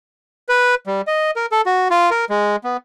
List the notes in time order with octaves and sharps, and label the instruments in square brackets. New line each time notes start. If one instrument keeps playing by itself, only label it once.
[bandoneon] B4
G3
D#5
A#4
A4
F#4
F4
A#4
G#3
B3